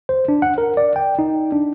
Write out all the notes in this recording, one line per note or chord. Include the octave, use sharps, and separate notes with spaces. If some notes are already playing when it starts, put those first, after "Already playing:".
C5
D4
F#5
A#4
D5
G5
D#4
D4